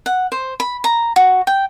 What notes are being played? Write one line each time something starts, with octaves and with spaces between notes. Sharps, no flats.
F#5
C5
B5
A#5
F#4
G5